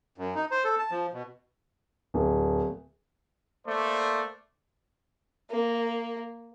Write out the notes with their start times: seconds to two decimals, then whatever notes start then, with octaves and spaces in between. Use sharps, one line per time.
0.18 F#2
0.35 D#4
0.51 C5
0.65 A4
0.78 A5
0.91 F3
1.13 B2
2.14 D1
3.67 A3 A#3 C5 D5
5.51 A#3